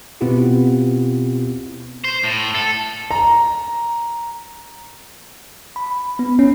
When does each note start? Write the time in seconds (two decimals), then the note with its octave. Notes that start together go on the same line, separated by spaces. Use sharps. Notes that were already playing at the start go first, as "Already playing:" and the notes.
0.21 B2 B3 C4 E4 F4 G4
2.04 C5
2.24 A2
2.55 A4
3.11 A#5
5.76 B5
6.19 B3
6.39 C#4